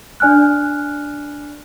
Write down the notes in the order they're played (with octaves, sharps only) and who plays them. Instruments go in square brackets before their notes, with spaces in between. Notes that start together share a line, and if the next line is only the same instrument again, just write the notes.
[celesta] D4 D5 G#5 F6 F#6